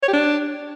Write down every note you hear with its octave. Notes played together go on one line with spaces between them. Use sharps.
C#5
G4
D4